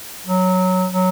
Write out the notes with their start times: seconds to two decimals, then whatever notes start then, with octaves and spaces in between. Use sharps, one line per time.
0.26 F#3
0.93 F#3